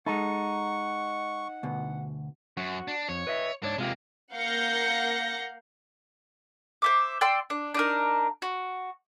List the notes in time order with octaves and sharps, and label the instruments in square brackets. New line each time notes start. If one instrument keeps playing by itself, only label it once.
[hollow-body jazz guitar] G#3 A4 [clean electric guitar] D#4 [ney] F#5 [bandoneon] C#6
[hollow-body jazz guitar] D2 B2
[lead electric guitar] F#2 [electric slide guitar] F#4
[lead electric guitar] D4
[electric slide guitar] F2 [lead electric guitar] C#5
[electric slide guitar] B4 D#5 E5
[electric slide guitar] G#2 C#5 D5 [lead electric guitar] D4
[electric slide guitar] C3 F4 G4 [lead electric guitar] G#3 A#3
[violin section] A#3 F5 F#5 G6 A#6 C#7
[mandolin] C5 E5 D6
D5 G5 C6 E6
D4
D4 D#4 A#4
F#4